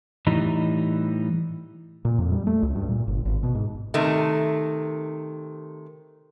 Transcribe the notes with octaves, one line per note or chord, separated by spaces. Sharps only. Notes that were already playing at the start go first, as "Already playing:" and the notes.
A2 E3 G3 D#4
A#2
F2
G3
A3
C#2
G2
A#2
G1
G#1
B2
G#2
C3 D#3 A3